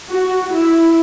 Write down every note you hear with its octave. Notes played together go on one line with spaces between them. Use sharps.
F#4
E4